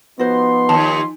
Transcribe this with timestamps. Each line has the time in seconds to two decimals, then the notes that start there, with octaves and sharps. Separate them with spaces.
0.19 F3 B3 D#4 F#4 C5 C6
0.69 D#2 A5